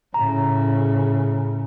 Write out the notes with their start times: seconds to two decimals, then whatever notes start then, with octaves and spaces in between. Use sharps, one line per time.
0.14 A2 C#3 A#5